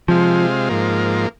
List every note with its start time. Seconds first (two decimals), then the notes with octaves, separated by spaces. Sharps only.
0.08 C3 F3 G#3 F4
0.69 G#2 F3 A#3